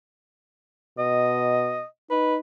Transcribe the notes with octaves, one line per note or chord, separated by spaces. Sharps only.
B2 D#5
D#4 B4